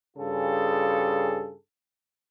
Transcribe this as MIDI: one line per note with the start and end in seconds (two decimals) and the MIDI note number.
0.17 1.53 43
0.17 1.53 49
0.17 1.53 65
0.17 1.53 68
0.17 1.53 69